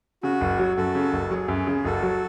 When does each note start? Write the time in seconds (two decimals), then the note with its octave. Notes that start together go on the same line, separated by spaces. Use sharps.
0.23 C#3 F#4
0.41 F#1
0.59 F#3
0.77 F#2 F#4 A4
0.95 C#3
1.13 F#1
1.30 F#3 G#4
1.48 F#2
1.67 C#3
1.85 F#1 F#4 A4
2.03 F#3